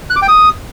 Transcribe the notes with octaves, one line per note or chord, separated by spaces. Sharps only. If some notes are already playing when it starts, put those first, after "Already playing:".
F#6
D6
G5
D#6